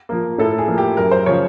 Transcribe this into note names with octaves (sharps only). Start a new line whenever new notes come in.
F3 A#3
A2 A4
G#4
F3 A#3
G4
F#2 A#4
C5
C#3 F3 C#5